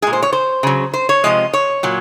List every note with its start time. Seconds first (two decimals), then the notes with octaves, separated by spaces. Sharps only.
0.02 A#2 G#3 G#4
0.13 C5
0.22 C#5
0.33 C5
0.63 C#3 F#3
0.94 C5
1.09 C#5
1.24 C3 F3 G#3 D#5
1.53 C#5
1.83 A#2 F#3